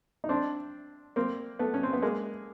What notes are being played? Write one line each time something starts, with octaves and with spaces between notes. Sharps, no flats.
D#4
C4 D4
A#3 C4
A3 B3
C#4
C4
B3
G#3 A#3